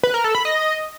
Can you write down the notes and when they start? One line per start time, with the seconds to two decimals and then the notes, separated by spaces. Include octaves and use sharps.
0.03 B4
0.14 A#4
0.24 A4
0.35 B5
0.45 D#5